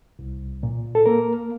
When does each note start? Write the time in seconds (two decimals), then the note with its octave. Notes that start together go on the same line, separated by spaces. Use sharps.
0.19 C2
0.63 A#2
0.95 A4
1.06 A#3 A#4